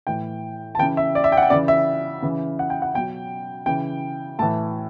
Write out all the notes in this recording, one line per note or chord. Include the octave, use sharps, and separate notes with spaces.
A2 E3 G5
A5
C#3 E3 G5
E5
D5
E5
G5
F#5
G5
C#3 E3 D5
E5
C#3 E3
F#5
G5
F#5
B2 F#3 G5
C#3 E3 G5
A2 E3 A5